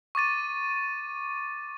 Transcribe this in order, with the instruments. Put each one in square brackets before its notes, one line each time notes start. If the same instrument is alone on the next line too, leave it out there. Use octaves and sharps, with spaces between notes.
[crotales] C#6 D6 A6 D#7